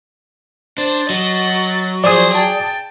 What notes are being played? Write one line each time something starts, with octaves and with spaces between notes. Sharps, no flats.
D4 C5 A6
F#3 D#5 F#5
F3 G#4 C5 D5 D#6
G5 A5